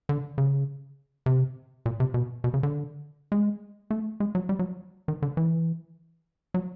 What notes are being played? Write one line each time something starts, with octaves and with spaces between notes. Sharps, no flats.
D3
C#3
C3
A#2
C3
B2
B2
C#3
D3
G#3
A3
G#3
F#3
G3
F#3
D#3
D3
E3
F#3